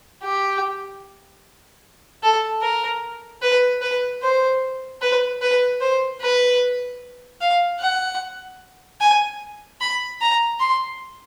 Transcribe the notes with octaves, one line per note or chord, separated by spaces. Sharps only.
G4
A4
A#4
B4
B4
C5
B4
B4
C5
B4
F5
F#5
G#5
B5
A#5
C6